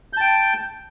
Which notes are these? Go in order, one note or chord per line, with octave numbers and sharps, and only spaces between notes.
G5 A5 G6